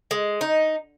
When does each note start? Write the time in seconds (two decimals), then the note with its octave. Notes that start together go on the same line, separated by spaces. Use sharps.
0.11 G#3
0.41 D#4